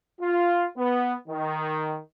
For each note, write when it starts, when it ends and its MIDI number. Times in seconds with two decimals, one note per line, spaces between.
0.21 0.65 65
0.77 1.12 59
1.29 1.98 51